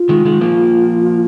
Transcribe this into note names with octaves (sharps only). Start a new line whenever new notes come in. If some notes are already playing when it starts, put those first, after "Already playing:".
Already playing: F4
D#3 G#3
D#3 G#3
F3 A#3